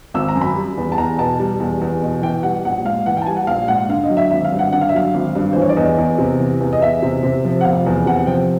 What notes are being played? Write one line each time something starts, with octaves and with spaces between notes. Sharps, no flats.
G#1 E6
A#5
F#2
B5
G3
E2
A5
E2 A#5
B2 A5
G3
E2
E2
B2
E3 G5
G3 F#5
A#1 F#5
G#2 F5
E3 F#5
G5
A5
G3 G#5
F#5
A#1 F5
G#2 F#5
D3 F5
D#5
F#3
E5
G#1 E5
F5
G2
F#5
D3 F#5
F5
E5
F#3 F5
G#1
G2
E3 C5
C#5
D5
E2 D#5
E2
C3
E3
E2
D#5
E2 E5
C3
C3
F3
F#5
F1 F5
E2
C3 F#5
F3 G5